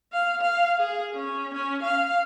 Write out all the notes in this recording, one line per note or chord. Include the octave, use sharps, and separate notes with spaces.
F5
F5
G#4
C#4
C#4
F5